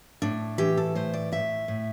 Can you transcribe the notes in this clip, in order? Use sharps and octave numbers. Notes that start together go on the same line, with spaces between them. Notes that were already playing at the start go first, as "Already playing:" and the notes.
A2 D4
E3 G4
A4
A2 C5
D5
A2 E5
A2